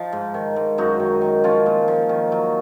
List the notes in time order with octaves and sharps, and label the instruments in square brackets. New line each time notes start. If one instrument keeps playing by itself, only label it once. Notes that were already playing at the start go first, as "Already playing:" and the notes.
Already playing: [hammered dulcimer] F3 D#4 F4
G#2
D#3
G#2
F#2 D#4 F#4
D#3
D#3
F3 C#4 F4
A#2
F3
D#3
F#3